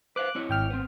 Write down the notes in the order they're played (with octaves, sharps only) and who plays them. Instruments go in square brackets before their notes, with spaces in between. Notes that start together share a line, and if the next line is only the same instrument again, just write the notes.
[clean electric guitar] B4 C5 F5 [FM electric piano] D6 F#6
[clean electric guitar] C4 E4 C#5
[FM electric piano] G#1 G5 F6
[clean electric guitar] B3 C4